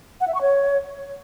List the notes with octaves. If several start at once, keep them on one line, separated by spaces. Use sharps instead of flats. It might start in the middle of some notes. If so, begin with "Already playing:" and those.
F#5
E5
C#6
C#5